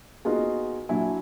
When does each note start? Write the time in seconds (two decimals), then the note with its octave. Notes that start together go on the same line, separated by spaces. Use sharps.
0.25 A#3 B3 D#4 F4 F#4 G#4
0.89 A#2 F#3 D4 E4 G#5